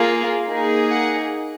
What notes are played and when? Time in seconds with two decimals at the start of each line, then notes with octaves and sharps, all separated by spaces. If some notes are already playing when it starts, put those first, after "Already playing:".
Already playing: A#3 F4 G#4
0.44 A#3 D#4 G#4
0.91 F#5